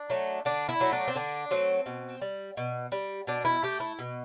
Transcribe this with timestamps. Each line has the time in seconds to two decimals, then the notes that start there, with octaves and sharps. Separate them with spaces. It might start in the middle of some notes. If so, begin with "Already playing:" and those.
Already playing: D4
0.10 F#3 A3
0.45 D3 D4
0.69 E4
0.80 F#3 A3
0.93 D4
1.08 C4
1.15 D3 D4
1.51 F#3 A3 C4
1.86 B2
2.21 G3
2.57 B2
2.92 G3
3.27 B2 D4
3.45 E4
3.63 A3 G4
3.80 E4
3.99 B2